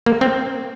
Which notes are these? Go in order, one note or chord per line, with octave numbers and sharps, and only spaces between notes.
A#3
C4